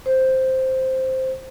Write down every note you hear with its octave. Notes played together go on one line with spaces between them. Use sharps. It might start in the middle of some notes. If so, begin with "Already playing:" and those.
C5